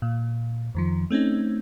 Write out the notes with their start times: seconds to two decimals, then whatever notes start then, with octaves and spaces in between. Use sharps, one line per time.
0.02 A#2
0.75 F2 D#3 F3
1.10 A3 C4 C#4 D#4